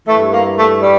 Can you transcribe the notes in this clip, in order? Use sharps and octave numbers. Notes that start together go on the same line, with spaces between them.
G2 E3 A3
A#3
A3
G3